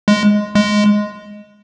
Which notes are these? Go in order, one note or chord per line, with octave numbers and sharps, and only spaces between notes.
G#3
G#3